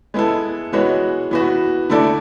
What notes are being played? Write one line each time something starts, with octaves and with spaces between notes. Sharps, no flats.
G#3 B3 E4 A4
E3 G#3 B3 F#4 C#5
E3 B3 F#4
D3 A3 E4 A4 D5